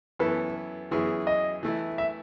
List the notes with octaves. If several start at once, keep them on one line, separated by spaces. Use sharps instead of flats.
F#2 E3 B3 E4 A4 B4
F#2 E3 B3 E4 G#4
D#5
E3 A3 E4
E5